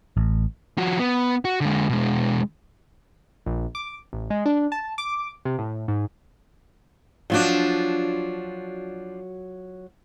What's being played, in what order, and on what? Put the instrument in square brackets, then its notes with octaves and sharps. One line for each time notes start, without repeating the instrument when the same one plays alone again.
[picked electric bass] A1
[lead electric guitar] F3 F#4
B3
F#4
D3 G#3
B2 G#3
[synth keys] A#1
D6
A1
G#3
D4
A5
D6
C3
A2
G#2
[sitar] F3 D4 [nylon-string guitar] F#3 F4 F#4